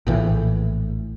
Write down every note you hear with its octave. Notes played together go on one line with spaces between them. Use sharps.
A#1 A2 E3